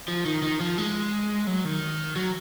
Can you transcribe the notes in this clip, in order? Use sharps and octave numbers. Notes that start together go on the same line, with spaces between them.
F3
D#3
D#3
F3
G#3
F#3
D#3
F#3